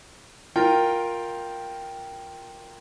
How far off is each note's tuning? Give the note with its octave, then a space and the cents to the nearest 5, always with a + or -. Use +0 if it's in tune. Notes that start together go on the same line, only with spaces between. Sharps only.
F4 +15 A#4 +0 G5 +0